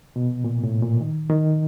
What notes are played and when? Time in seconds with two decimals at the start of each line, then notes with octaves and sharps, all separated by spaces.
0.16 B2
0.44 A#2
0.63 A2
0.82 A#2
1.01 D#3
1.29 D#3